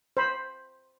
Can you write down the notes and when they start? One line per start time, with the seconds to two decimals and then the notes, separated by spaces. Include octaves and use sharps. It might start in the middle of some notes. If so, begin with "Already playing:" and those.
0.17 C5 B5